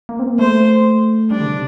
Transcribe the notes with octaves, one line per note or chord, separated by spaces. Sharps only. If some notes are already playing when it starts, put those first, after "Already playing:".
A#3
C4
A#3
A3 C5
G3 D4
D3
C3